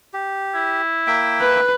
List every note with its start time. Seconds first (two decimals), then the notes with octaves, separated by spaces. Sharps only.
0.14 G4
0.55 E4
1.07 A#3 E5 G5
1.41 B4